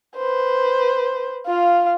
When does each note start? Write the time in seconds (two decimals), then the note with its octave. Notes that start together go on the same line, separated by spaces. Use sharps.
0.16 B4 C5
1.46 F4 F5